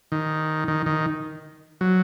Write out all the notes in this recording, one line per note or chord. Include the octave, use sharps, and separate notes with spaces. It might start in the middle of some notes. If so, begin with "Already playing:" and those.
D#3
D#3
D#3
F#3